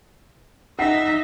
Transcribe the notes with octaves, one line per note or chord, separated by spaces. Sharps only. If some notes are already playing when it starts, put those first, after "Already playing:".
D#4 E5 F#5 C7